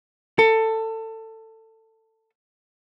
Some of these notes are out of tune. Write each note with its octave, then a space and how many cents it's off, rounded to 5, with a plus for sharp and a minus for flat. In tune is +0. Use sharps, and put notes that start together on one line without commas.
A4 +20